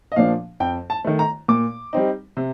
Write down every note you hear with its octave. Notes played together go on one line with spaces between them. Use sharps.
D#5
A#2 F3 A#3 D4 F5
F2 G5
A5
D#3 A3
A#5
A#2 D6
G3 C4 D#4
C3